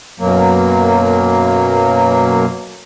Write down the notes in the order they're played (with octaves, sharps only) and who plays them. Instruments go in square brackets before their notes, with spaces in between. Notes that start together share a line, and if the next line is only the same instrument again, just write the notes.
[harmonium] F#2 B2 F#3 A#3